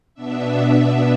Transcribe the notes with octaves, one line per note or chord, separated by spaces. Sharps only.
B2 B3 D4 E5